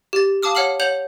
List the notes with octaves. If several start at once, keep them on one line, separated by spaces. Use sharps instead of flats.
G4 A6
F5 A5 D6 D#6 F6
C#5 F#5 F6 C7 F#7
C#5 F#5 G6 F7 F#7